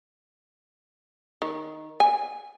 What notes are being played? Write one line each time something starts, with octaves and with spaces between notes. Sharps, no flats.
D#3
G#5